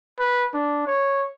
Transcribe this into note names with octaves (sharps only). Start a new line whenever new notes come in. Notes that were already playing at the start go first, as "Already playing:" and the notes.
B4
D4
C#5